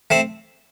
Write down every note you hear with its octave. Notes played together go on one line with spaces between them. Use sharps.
A3 C4